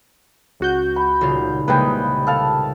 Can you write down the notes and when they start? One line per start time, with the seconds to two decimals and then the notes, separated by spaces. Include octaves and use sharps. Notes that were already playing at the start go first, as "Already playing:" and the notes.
0.60 C#2 F#4 G6
0.96 B5
1.21 D#1 C#3 F4
1.68 C2 C#3 G#3 A#3 B4 G5
2.27 A4 F5 A5